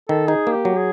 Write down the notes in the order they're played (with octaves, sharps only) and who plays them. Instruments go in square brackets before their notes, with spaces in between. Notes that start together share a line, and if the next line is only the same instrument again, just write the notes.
[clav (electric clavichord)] D#3 [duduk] A4
[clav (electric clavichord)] D#4 [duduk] G#4
[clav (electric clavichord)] A#3
[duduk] G4
[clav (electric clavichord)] F#3
[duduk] G#4